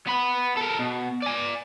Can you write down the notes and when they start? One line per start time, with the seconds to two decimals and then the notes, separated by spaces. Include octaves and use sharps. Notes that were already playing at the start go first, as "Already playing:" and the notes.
0.07 B3 B5
0.57 A4 A#4
0.79 B2
1.23 D5 G#5